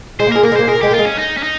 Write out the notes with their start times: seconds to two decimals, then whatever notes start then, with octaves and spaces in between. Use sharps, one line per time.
0.20 G#3 C5
0.27 A#3
0.32 G#3 A#4
0.43 A#3 A#4
0.52 G#3
0.56 A#3 C5
0.68 G#3 A#4
0.75 A#3
0.81 G#3 G4
0.91 A#3 F4
0.99 G#3
1.06 C#4
1.18 D#4
1.37 C#4
1.43 D#4